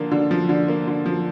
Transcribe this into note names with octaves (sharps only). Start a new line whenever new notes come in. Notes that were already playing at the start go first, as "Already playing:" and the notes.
Already playing: D3 F3 A#3
D3
F3
D3
A#3
D3
F3